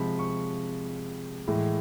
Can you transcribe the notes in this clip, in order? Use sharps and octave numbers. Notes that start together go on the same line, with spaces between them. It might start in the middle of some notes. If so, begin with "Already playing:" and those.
Already playing: C3 F3 G#3 B5
C#6
A2 E3 G#3